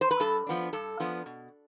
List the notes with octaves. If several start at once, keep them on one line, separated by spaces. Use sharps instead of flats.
C5
B4
G2 A4
F3 B3 D4
G2 A4
F3 B3 D4
B2